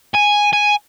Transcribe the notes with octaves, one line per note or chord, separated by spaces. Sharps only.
G#5
G#5